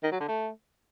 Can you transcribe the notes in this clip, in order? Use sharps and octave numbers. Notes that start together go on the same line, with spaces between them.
D#3
F#3
D3
A3